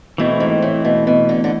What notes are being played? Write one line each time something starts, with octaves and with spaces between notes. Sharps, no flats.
B2 E3 A3 C4 E4
G#2
A2
B2
B2
D3
D3